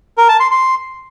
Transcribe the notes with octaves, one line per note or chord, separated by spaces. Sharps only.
A#4
A5
C6
C6